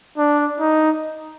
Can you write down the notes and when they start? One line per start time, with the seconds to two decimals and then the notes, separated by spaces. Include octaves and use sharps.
0.18 D4
0.60 D#4